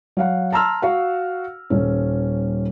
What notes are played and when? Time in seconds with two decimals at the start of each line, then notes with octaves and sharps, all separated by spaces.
0.17 F#3 F5 F#5
0.52 A5 A#5 C6 E6 F6
0.82 F#4 F5 F#5
1.70 D#1 C#4